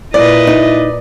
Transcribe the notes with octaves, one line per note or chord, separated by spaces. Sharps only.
A#2 E4 B4 D5 D#5
D#4